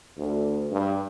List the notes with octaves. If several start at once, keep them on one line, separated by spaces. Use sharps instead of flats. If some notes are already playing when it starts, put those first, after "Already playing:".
D2
G2